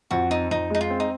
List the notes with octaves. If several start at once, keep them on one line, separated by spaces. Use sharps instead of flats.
F2 F#4
C4 D#4
F2 D#4
G#3 D#4
F4
C4
D#4